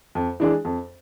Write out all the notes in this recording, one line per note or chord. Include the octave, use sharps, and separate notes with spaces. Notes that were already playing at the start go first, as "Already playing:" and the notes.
F2
E3 G#3 D4 G#4
F2